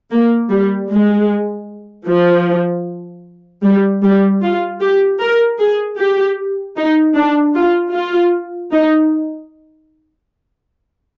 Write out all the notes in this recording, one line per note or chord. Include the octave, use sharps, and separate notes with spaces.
A#3
G3
G#3
F3
G3
G3
F4
G4
A#4
G#4
G4
D#4
D4
F4
F4
D#4